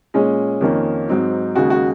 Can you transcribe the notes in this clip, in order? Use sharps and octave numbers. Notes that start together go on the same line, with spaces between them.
A#2 G#3 C#4
F2 D#3 A#3 C#4
G#2 F#3 C4 D#4
D#2 C#3 G#3 F#4
F#4